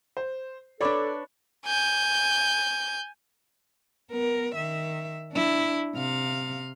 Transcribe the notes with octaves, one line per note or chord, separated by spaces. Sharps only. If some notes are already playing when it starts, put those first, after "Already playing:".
C5
D4 A4 B4 C#5 D5 B5 D6
G#5 G6
B3 A#4
D#3 E5
D4 E4
C3 F5